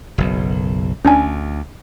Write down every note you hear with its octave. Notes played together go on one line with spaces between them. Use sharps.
F#1 B1
D2 C#4 D4 G#5